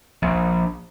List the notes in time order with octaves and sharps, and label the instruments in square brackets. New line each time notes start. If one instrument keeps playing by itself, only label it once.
[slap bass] A#1